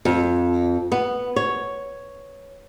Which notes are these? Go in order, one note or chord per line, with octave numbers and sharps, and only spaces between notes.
F2
B3
C#5